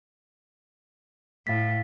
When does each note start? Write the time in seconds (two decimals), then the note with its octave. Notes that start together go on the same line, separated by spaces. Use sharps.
1.47 A2 F5 A6 B6